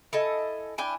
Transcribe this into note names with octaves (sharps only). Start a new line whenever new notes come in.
E4 A4 D#5 G#5
D4 E4 G5 G#5